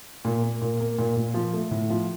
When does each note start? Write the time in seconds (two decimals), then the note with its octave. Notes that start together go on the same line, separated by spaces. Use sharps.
0.25 A#2
0.43 A#3
0.61 A#2
0.80 A#3
0.98 A#2
1.16 A#2
1.34 F3
1.53 A3
1.71 A2
1.90 F3